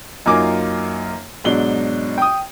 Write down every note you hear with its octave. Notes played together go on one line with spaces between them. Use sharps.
F#2 A#3 D#4 F4 G#5 D6
G#2 B2 F#3 D4 G7
G5 D#6